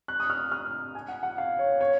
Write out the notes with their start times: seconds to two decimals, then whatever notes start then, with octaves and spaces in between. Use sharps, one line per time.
0.08 F#6
0.20 D#6
0.30 F6
0.52 F6
0.95 G#5
1.08 F#5
1.23 F#5
1.38 F5
1.59 C#5
1.81 C#5